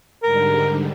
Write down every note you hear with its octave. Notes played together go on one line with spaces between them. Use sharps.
G#2 D3 G3 A#4